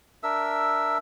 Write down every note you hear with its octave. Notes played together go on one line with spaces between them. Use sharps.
D4 A#4 E5 E6